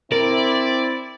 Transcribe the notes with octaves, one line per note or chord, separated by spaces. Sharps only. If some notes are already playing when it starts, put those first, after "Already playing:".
C4 E4 A#4 D5